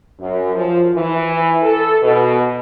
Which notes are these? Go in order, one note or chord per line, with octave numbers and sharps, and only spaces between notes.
F#2
F3
E3
A4
B2